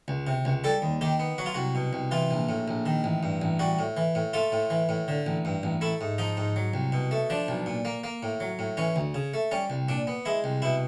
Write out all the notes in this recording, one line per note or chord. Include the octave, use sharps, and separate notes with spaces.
C#2
C3
C#2
G3 A4
D#2
D#3 G4
B3
F#3 F#4
F4
C2 F#4
B2
C2
E3 F4
A#1
A2
A#1
D#3
A1
G2
A1
G3 F#4
A2
E3
A2
A3 F4
A2
E3
A2
D3
A1
G2
A1
A3 E4
G#2
F3 D#4
G#2
F#3
C2
B2
A3
F3 D4
B1
A#2
A#3
A#3
A2
F#3
A2
E3 C#4
D2
C#3
A3
G3 C#4
C2
A#2 D4
B3
G#3 E4
C2
B2 E4